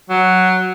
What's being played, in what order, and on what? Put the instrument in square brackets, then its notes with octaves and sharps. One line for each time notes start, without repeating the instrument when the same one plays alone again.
[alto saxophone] F#3